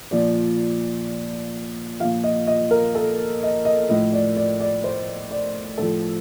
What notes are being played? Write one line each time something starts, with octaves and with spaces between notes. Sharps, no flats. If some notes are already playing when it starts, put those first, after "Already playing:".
A#2 F3 D5
A#2 F3 F5
D#5
D#5
A#4
A4
D#5
D#5
A2 F3 D#5
D5
D5
D5
C5
D5
A2 F3 A4